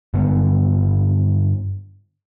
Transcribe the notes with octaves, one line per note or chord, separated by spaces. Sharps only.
G2 D3 G#3 B3